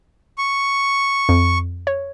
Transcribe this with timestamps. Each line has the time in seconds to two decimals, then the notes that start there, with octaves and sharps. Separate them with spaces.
0.38 C#6
1.29 F2
1.87 C#5